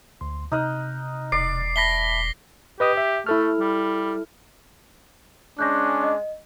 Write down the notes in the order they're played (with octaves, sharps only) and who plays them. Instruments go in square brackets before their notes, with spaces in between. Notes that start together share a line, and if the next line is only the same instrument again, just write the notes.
[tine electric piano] D2 C6
[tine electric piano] C3 F6 F#6 [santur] D#4 D#5
[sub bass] E1 [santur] D5 [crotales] C7
[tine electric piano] E5 A5 B5 [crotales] A#6 B6 G7
[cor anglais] G4 [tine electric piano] B4 D#5 D#6
[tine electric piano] E5
[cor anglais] A3 [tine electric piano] E4 A4 F6
[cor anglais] G3
[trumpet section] G#3 C#4 D4 [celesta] F#6 G6 A#6
[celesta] D#5